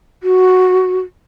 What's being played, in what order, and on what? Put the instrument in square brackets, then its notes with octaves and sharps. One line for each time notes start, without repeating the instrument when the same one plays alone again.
[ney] F#4